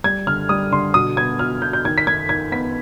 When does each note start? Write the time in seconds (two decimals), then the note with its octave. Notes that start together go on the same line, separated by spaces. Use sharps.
0.04 G3 G#6
0.27 D3 F6
0.49 G3 D#6
0.72 D3 C6
0.94 B2 D#6
1.16 B3 G#6
1.39 B2 F6
1.62 B2 G6
1.73 G6
1.85 D#3 G#6
1.98 B6
2.07 D#3 G#6
2.29 D#3 G#6
2.52 B3 B6